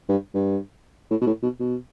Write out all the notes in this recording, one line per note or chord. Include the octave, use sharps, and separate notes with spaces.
G2
G2
A2
B2
A2
B2
B2